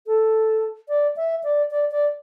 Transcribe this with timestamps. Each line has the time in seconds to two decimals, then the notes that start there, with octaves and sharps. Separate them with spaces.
0.07 A4
0.89 D5
1.16 E5
1.43 D5
1.71 D5
1.91 D5